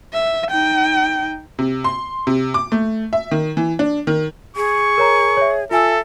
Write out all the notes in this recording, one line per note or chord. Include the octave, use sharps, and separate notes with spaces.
E5
D#4 G5
C3
C6
C3
D6
A3
E5
D#3
E3
D4
D#3
G#4 C#6
A#4 C#5 A#5
C#5 E5
F4 A4 E5 G#5 E6